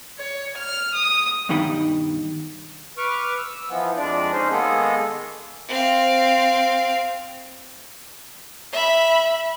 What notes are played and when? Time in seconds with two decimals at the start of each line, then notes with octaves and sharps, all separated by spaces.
0.19 C#5
0.58 F6
0.95 D#6
1.49 G2 B2 D#3 D#4 G5 B5
2.98 B4 C#6 D6 F6
3.38 E6
3.69 E3 F3 B3
3.97 F2 G#3 D4 D5
4.33 C#4 D#4 C5
4.51 D#3 G#3 A#3 B3 G#4 A4
5.68 C4 F5
8.73 E5 B5